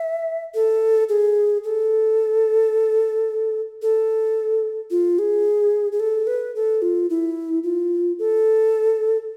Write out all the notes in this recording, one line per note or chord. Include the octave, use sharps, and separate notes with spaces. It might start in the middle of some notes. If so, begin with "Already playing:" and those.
Already playing: E5
A4
G#4
A4
A4
F4
G#4
G#4
A4
B4
A4
F4
E4
F4
A4